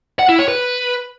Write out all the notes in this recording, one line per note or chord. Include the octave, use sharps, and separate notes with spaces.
F#5
E4
C#5
B4